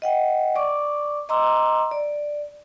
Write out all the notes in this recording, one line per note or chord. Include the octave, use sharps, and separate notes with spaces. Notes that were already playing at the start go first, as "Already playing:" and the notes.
D#5 F#5 G5
D5 C#6 D6
D#5 A#5 C6 D6 E6
D5